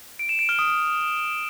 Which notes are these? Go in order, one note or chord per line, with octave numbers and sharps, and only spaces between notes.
D7
E7
D7
F6
D#6